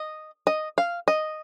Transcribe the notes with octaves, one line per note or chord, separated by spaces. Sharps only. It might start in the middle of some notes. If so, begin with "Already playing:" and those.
Already playing: D#5
D#5
F5
D#5